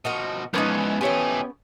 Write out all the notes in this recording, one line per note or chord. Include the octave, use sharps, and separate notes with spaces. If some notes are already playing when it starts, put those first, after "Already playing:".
B2 F3 D#4 F#4 A#4
E3 F3 G#3 A#3 B3 C#4 D#4 F#5
E3
F3 A3 G4 B4 C#5 D#5 G#5